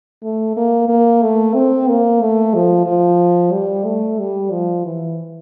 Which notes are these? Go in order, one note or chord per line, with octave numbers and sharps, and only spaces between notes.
A3
A#3
A#3
A3
C4
A#3
A3
F3
F3
G3
A3
G3
F3
E3